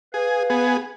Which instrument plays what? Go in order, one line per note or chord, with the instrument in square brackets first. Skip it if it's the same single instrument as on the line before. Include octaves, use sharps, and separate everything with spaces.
[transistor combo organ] G#4 [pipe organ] B4 F5
[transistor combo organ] B3 G#4